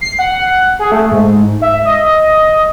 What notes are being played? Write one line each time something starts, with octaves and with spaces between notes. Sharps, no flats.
C7
F#5
G#4
A3
G#2
E5
D#5